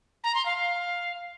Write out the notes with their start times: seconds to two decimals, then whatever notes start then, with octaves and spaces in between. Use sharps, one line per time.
0.24 A#5
0.35 C6
0.46 F5
0.57 F5